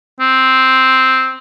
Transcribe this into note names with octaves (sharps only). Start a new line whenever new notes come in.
C4